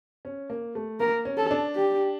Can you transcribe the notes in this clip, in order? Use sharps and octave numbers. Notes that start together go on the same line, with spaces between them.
C#4
A#3
A3
A#3 A#4
C#4
A4
D4
G4